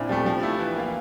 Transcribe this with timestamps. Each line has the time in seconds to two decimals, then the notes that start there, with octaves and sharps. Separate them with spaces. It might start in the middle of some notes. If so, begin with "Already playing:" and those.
Already playing: A#2 C4 D4 E4
0.09 F3 G3 A3
0.25 F3 G3
0.42 A3 E4
0.59 E3
0.76 A#3 F4